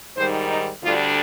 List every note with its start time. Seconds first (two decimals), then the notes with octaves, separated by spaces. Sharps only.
0.16 G#2 D#3 G3 C5
0.49 D#4
0.83 D2 D3 G3 D4 F4